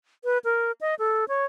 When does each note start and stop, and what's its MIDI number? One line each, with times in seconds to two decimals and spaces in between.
0.25 0.38 71
0.44 0.72 70
0.81 0.95 75
0.99 1.25 69
1.28 1.45 73